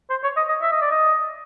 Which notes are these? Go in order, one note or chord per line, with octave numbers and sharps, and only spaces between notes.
C5
C#5
D#5
D#5
E5
D#5
D5
D#5